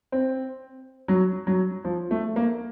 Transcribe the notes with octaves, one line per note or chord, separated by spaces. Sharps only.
C4
F#3
F#3
F3
A3
A#3